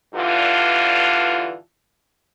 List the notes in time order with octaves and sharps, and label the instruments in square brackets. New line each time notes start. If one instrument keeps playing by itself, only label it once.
[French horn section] G2 D3 E3 F4